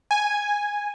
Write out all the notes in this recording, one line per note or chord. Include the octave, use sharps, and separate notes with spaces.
G#5